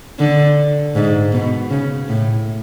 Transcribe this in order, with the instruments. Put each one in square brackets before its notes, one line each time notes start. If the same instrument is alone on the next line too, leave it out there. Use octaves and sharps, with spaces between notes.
[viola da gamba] D3
G#2
B2
C#3
A2